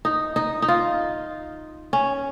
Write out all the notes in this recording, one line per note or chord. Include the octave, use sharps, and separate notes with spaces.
D#4
D#4
D#4
F4
C#4